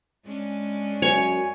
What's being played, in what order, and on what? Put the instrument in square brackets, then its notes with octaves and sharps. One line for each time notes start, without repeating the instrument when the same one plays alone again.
[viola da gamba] G#3 C#4 D4
[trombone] F#2 [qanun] C#5 [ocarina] G#5